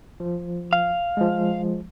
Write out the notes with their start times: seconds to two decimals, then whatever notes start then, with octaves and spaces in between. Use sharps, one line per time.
0.20 F3
0.73 F5
1.17 F3 G#3